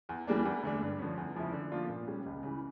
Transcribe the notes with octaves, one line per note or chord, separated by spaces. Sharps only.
E2
E3 G3 A#3 D4
E2
D3 A3 D4
G2
D3 F3 C#4
E2
C#3 F3 C#4 E4
D3
F3 A#3 D4 F4
A#2
G3 C#4
C#2
C#3 E3